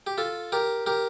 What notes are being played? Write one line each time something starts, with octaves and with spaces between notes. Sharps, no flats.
G4
F4 A4
G4 A#4
G4 A#4